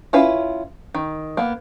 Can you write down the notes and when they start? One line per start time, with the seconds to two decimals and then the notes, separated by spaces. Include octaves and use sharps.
0.13 C#4 E4 F4 B4
0.95 D#3
1.37 A#3 B3